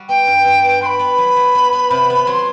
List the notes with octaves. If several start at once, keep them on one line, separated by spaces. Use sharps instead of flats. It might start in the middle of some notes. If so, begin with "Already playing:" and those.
Already playing: G3 F#4
B3 G5
G2
G2
B3
F#4 B5 C6
B3
F#3
F#3
B3
B3
C3
B3
F#3 C6